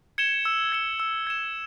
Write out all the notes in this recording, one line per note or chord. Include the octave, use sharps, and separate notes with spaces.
G#6 C#7 E7 G7
E6
G#6 C#7 E7 G7
E6
G#6 C#7 E7 G7